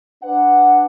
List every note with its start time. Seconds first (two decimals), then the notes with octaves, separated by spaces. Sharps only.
0.23 D4 B4 F#5